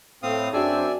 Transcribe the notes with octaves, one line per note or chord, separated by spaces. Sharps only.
A2 C4 F5 D#6
F#2 C4 D4 F#4 G#4 D5 E5 G#5